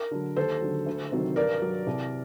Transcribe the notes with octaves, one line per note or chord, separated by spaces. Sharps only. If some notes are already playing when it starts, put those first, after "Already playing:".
Already playing: A#4
D3 F#3
D#2 A4 C5
D3 F#3
D2
C3 D#3 F#3
G2 A#4 D5
F#3
C2